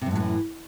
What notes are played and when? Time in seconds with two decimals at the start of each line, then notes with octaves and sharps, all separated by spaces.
0.01 C3
0.06 F#2
0.11 A2
0.16 F#3
0.20 E3